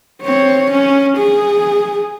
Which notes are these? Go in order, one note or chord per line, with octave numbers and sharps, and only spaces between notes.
C4 C#5
C#4
G#4